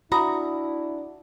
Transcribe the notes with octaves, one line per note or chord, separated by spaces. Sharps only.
D4 E4 F#4 A#5 B5 D#6